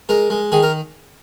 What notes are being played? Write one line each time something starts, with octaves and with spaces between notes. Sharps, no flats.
G#3 A#4
G#3
D#3 G#4
A#4